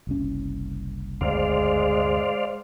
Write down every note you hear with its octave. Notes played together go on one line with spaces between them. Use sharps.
F#1 C2 C#4
D2 G2 C3 G#3 C5 D5 F5